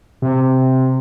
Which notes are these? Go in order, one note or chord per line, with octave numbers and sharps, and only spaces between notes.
C3